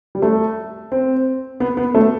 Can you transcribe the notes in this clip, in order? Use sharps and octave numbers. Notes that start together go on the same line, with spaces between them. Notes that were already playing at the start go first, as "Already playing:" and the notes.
G3
A3
C4
B3
B3
A3